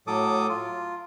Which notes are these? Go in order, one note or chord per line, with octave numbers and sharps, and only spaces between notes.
A2 F#3 A4 D6 D#6
F4